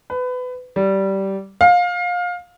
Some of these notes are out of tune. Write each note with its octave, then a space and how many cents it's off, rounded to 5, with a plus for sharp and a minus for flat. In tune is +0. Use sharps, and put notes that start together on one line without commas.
B4 +25
G3 -15
F5 +25